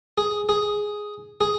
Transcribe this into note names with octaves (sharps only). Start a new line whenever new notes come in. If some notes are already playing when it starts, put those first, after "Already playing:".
G#4
G#4
G#4